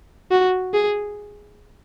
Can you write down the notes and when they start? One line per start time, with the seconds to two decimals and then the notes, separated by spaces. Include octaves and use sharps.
0.31 F#4
0.74 G#4